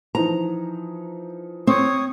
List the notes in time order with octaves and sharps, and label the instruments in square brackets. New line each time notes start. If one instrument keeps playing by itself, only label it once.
[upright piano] E3 F3 D#4 [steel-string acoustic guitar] A#5
[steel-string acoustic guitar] C4 [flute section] C#5 C#6 D#6